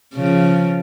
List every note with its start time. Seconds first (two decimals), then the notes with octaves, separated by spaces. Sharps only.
0.15 C#3 F3